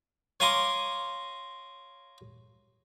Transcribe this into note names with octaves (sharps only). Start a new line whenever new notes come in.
C#5 F5 G#5 A#5 C6 D6